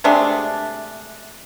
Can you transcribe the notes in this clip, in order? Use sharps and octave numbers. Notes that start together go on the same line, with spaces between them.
C3 G#3 A3 D4